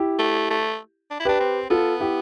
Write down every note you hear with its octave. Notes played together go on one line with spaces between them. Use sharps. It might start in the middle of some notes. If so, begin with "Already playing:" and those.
Already playing: E4 G4
A3
A3
D4
E4
D4 G4 B4
C4
B3 F4 A4
E4 G4